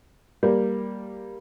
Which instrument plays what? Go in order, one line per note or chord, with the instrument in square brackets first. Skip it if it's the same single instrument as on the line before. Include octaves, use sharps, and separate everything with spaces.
[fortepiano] G3 A#3